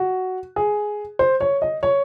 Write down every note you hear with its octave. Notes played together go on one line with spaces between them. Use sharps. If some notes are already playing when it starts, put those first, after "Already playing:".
Already playing: F#4
G#4
C5
C#5
D#5
C#5